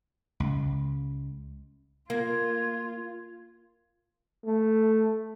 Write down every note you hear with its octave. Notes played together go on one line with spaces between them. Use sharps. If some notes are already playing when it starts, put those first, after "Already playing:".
C#2
A#3 F4 G#6
A3